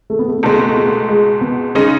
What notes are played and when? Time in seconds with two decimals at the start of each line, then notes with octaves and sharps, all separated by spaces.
0.10 A3
0.19 B3
0.28 A3
0.38 B3
0.43 C#2 B2 G#3 A3
0.57 B3
0.67 A3
0.76 B3
0.86 A3
1.09 G#3
1.41 B3
1.75 C#3 G#3 C#4 D#4